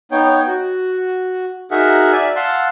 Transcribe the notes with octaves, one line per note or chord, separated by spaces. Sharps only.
B3 D#4 C#5 G5
F#4
D#4 F#4 G#4 A#4 E5 F#5
D5 E5 G#5
F5 F#5 A5 C6 E6